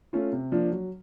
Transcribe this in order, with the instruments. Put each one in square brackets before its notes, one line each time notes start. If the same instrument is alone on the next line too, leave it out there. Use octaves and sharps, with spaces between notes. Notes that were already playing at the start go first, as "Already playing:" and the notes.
[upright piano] A3 C#4 F4
C3
F3 A#3 D4 F4
F#3